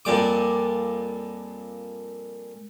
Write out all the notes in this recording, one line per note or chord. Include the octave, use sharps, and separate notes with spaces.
F2 A#2 G3 D6